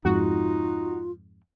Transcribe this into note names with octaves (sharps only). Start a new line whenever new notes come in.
F2 G#2 D#4 F4 F#4